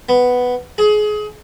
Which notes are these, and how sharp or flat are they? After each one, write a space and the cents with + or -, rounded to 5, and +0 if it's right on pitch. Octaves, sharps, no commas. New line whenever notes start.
B3 +5
G#4 +25